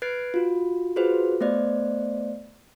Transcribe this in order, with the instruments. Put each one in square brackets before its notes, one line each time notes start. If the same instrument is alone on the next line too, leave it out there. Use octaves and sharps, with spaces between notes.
[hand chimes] B4 F#6 G#6 A6 C7 D7
F4 F#4
F4 F#4 G#4 B4 C5
A3 B3 C5 D5